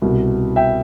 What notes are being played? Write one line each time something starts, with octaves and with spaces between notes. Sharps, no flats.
C2 B2
E5 G5